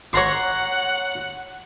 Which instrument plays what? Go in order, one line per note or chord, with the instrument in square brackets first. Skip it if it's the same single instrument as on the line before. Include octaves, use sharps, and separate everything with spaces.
[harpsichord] C#5 A#5 C6 [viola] F#5